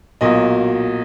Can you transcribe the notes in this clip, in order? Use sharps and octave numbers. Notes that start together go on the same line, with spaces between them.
B1 A#2 F#3 D#5